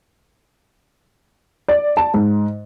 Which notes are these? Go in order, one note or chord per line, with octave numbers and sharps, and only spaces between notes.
D5
A5
G#2